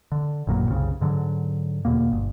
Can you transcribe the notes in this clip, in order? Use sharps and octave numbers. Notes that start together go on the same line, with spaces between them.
D3
A1 F#2 A#2 F#3
F#1 C2 C#3
G#2 D3 F#3
E2 B2 A#3
G1